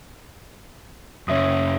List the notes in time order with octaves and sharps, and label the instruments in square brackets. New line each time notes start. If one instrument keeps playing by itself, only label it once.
[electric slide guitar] F#2 C#3 [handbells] C#5 E5 D#6